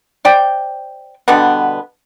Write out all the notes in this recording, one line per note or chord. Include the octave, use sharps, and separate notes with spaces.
C5 D5 G5
B2 D3 G3 B3